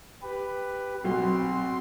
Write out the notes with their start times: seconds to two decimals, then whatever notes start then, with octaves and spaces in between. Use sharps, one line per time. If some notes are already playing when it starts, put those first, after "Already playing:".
0.22 G4 B4
1.04 B1 C4 C6